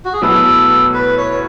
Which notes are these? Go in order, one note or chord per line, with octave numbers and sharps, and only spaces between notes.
F#4
G#4
B2 F#3 A3 E4 A4 B4
B4
C#5